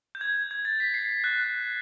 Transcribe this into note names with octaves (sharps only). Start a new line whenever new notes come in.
G6
G#6
G#6
A6
B6
C7
C7
F#6